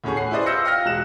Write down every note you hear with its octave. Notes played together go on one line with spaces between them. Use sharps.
D2 A2 C#4 G#4 C#6
F#5 C7
E4 G#4 B4 C5 D5 D#5
F4 E6 G6 A#6 C#7
D#5 F5 G5 F6 A#6
E1 G#3 F#6 E7